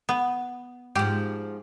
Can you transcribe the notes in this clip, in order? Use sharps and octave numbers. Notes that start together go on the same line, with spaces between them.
B3
G#2 F3 G4